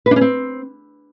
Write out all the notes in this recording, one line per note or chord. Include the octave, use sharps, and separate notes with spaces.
B4
D4
C#4
C4